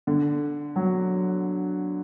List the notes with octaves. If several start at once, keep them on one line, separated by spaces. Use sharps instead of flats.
D3
F#3